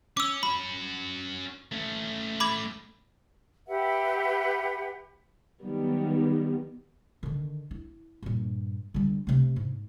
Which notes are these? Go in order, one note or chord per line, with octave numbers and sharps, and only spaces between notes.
C#4 D6 E6
C#4 F#4 B5
A3 C#4
B5 D6 G#6
G4 B4 E5 F#5
D#3 F#3 G3 B3
D3 D#3
E4
G2 A#2
D3 G3
C3 A3
G#2